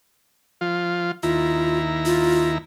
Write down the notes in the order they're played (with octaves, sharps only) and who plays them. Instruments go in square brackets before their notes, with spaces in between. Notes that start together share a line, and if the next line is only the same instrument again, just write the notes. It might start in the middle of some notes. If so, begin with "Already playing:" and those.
[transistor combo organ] F3 F4
[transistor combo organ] D#2 E4 A#5 [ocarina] F4
[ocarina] F4